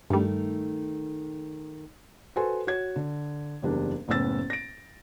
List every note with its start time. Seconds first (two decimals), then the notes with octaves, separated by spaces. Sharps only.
0.10 G2 D#3 G3 A3
2.36 F#4 A4 B4 C5 G#5 C6
2.67 F#4 C#5 G#6
2.96 D3
3.62 F#1 E2 G3 D4 A#4
4.08 F#1 A2 B3 C#4 E6 A6
4.50 A#6 D7